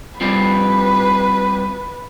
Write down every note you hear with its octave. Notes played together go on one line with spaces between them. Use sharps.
G3 C4 F4 B4